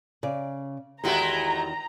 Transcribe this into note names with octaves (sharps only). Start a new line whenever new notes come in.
C#3 D5
E2 D#3 G#3 A3 E4 F#4 G4 A#5